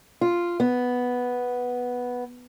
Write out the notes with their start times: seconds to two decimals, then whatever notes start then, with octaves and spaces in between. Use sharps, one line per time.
0.21 F4
0.60 B3